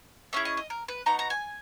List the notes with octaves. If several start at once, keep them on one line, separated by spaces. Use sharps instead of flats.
A#3 C#4 E4 G#4 E5
D#5
D#5
A#4
B4
B3 D#4 F#4 A#5
A#5
G#5